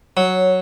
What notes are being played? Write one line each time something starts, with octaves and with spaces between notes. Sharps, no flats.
F#3 C#5